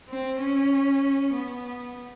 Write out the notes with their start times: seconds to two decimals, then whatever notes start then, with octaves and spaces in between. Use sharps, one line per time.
0.09 C4
0.40 C#4
1.34 B3